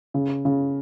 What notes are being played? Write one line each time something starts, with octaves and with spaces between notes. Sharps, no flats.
C#3
C#3